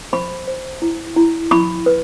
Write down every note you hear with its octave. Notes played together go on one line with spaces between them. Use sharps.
C5 B5 C#6
C5
E4
E4
E4 B5 C#6
B4